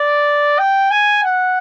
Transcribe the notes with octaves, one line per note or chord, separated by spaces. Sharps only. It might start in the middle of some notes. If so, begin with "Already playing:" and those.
Already playing: D5
G5
G#5
F#5